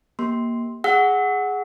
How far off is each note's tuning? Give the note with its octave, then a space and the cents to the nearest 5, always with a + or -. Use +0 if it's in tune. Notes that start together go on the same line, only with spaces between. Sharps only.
A#3 +10 G4 +0 C6 +0
G#4 +0 F#5 +0 E6 -25